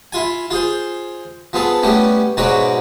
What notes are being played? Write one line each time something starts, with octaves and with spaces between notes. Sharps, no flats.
E4 F4 G#5
F4 G#4 C5
F3 B3 G#4 A4
G3 A3 B3 C#4
G#2 B2 F#3 F#4 C#5 D5